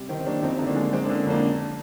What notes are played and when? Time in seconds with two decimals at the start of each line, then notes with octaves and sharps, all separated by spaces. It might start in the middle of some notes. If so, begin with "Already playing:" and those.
Already playing: C3 G3
0.09 D#3 C4
0.26 G3 A#3 D4
0.42 F2 C4 D#4
0.57 D3 D#4
0.67 A#3 D4
0.76 G#3
0.93 G#3 C4
1.05 A#3 D4
1.09 D3
1.26 F2 A#3 D4